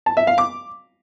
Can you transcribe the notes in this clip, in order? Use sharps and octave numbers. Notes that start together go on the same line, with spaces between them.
A5
E5
F5
D6